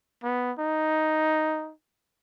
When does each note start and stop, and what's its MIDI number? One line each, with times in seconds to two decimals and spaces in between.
0.23 0.52 59
0.59 1.72 63